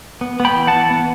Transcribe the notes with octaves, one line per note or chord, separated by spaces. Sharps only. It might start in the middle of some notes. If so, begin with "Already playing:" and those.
B3
B3
G5 B5
E3
F#5 A5
E3
B3